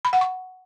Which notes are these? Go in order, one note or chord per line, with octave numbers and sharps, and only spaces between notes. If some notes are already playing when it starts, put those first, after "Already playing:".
B5
F#5
C#6